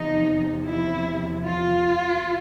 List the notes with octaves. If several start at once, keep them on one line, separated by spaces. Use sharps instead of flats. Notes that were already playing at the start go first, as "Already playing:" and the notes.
Already playing: E2 C3 F3 D#4
E4
F4